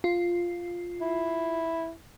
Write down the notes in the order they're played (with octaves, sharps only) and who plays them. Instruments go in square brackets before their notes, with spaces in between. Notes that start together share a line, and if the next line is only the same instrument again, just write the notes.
[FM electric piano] F4
[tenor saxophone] E4